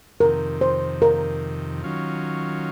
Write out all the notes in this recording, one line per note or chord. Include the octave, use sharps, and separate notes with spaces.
F2 C3 D#3 A#4
C5
A#4
D#3 F#3 C#4 F4